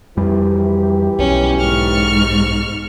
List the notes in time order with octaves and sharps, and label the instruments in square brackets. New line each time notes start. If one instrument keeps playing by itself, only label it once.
[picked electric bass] F2 G3 [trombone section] E3 G4
[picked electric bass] B1 [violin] C#4
[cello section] G#2 [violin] C#6 F6